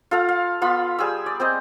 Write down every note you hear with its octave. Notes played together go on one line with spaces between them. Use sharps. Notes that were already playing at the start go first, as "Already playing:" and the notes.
F4 A4 F5 F#5
F5
B3 F4 B5 C6
G3 G#4 G#5 E6
D5
C4 C5 D#5